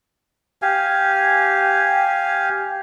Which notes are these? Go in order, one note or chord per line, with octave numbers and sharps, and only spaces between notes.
G4 F5 G#5